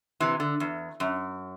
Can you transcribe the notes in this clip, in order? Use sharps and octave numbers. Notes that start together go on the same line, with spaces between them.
C3 E3
D3
E2
F#2